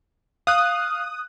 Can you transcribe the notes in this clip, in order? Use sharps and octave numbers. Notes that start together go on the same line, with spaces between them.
F5 D#6 F#6